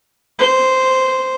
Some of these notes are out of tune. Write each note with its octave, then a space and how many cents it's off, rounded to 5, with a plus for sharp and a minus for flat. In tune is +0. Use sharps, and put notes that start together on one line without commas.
C5 -5